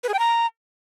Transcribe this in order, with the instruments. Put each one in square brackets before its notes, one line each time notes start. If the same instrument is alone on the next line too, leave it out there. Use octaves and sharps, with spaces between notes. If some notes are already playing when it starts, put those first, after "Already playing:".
[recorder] B4
G#4
G5
A#5